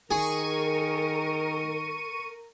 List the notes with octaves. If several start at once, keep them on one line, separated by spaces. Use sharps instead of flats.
D#3 G#4 A#4 C#6 D#7